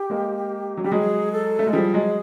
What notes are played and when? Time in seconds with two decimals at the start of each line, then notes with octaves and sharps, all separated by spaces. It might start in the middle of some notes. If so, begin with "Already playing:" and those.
Already playing: G4
0.10 G#3 A#3
0.77 F#3
0.84 G3 G4
0.92 F#3 G#3 G#4
1.32 A4
1.59 A3
1.67 G#3
1.73 F3 G3 G#4
1.94 F#3 G#3